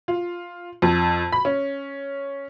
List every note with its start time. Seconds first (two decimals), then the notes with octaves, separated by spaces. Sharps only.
0.08 F4
0.82 F2
1.32 B5
1.45 C#4